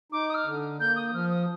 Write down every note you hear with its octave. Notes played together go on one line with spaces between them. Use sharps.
D#4 D6
D#6
F6
D3
A#3 G6
D#6
F3 F6
D#6